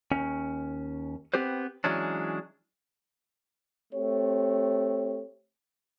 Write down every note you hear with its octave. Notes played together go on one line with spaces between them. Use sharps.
D#2 C#4
B3 C4 G4 B4 C5
E3 F#3 G#3 C#4 D4
A3 C4 G4 C#5